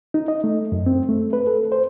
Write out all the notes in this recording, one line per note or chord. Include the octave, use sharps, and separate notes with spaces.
D#4
D#5
A3
F#2
C4
A3
B4
A4
C5